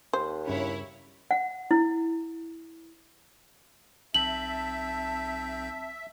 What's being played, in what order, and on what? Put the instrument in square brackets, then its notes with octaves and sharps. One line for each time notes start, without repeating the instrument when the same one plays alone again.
[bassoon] D#2 [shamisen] C5
[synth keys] G2 C#3 [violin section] E4 C#5
[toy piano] F#5
E4
[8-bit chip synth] B1 C4 G6 [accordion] E5 [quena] A5 [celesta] F#7